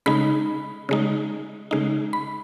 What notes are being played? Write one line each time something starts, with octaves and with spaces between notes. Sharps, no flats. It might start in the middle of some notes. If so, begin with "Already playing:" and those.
C#3 G#3 D#4 B5
C#3 G#3 D#4
C#3 G#3 D#4
B5